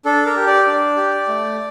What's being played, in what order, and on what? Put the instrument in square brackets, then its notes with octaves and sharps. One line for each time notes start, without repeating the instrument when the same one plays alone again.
[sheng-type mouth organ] D4 A4
A#4
G4
D5
D4
G4
A3